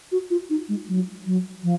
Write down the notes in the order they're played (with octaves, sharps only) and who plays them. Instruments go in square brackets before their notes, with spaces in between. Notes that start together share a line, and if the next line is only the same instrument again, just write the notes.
[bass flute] F#4
F4
D#4
G#3
F#3
F#3
F3